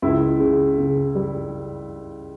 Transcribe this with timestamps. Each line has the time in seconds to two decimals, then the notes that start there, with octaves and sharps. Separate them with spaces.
0.02 C#2 E4
0.40 C#3
0.78 C#3
1.15 G3